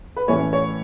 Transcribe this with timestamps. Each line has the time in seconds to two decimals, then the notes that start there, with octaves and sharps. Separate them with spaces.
0.16 B4
0.28 A2 E3 A3 C#4 C#5
0.53 C#5